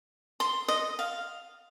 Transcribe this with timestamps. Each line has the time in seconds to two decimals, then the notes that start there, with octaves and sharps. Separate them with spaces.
0.40 C6
0.68 D#5
0.99 F5